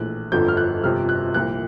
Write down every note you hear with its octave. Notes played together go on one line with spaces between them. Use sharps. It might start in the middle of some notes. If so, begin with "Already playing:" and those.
Already playing: A#1 A2 E3 F#6
G1 F2 D3 F3 G6
F6
F#6
G1 F2 C3 F3 F6
F#6
C2 A#2 F3 F#6